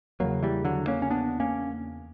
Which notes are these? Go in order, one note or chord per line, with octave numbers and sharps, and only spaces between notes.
E2 C#3 F#3 A#3
E3 G3
D3 F#3
A#3 C#4
C#4
B3 D4
A#3 C#4